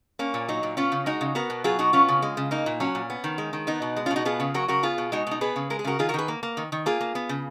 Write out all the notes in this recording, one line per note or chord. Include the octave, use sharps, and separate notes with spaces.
A#3 C#4
A#2
F#3 D#4
A#2
B3 C#4 F4
C#3
G#3 D#4 F#4
C#3
B3 F#4 A#4
B2
F#3 F4 G#4
B2 D#4 F#4
B3 C#4 F4
C#3
G#3
C#3
A#3 D#4
A#2
F#3 C#4
A#2
B3
D#3
G#3
D#3
B3 D#4
B2
G#3
B2 C#4 F4
D#4 F#4
B3 F4 G#4
C#3
F#3 F#4 A#4
C#3 F#4 A#4
B3 F4 G#4
B2
G#3 D#4 F#4
B2 D#4
B3 G#4 B4
C#3
G#3 A#4
G#4
C#3 F#4 A#4
D#3 F4 G#4
F#4 A#4
D#3 G#4 B4
A#3
A#3
D#3
D#3
A#3 F4 G#4
A#3
B3
C#3